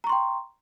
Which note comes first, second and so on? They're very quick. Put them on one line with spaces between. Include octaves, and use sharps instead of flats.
A#5 C#6 C6 G5